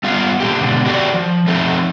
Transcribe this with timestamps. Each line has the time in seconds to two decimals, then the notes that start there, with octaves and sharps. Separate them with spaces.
0.03 G3 B3 F4 F5
0.40 A#2 D3 G4
0.60 G#2 B2 D3
0.86 F#4 G4 A4 D5
1.14 F3
1.47 F3 A3 C4 D#4